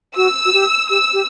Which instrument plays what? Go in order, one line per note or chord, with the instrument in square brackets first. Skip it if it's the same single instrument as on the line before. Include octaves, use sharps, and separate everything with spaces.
[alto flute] F#4 [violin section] E6
[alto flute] F#4
G4
[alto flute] G4 [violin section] E6
[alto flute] G4